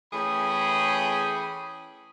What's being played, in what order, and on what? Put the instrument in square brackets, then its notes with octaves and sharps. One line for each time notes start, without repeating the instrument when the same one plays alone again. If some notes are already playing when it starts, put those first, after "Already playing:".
[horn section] E3 A3 C#4 G#4 G5 B5